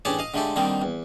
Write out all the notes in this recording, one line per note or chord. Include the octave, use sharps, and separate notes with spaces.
A1 D4 G4 G#4 C#5 A5
D#5 F5
D3 G#3 A3 G4 A4
D3 D#3 G3 A#3 C4 D#4
E2